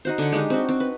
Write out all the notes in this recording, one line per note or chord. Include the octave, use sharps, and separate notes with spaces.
D#4 F#4 C5
D3 F#5
G#3 D4 D#4 G4
C4 F#4
C4
B4